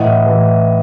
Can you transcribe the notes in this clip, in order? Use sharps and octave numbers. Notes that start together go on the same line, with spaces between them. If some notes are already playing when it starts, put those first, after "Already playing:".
Already playing: A2 E3 D#5 F#5
A2 E3